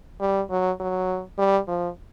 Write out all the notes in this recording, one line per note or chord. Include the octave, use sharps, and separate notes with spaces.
G3
F#3
F#3
G3
F3